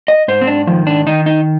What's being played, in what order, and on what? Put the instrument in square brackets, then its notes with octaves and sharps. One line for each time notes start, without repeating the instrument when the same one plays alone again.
[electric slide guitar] D#5
G#2 C5
C4
D4
D#3 F3
D4
D#3 D#4
D#4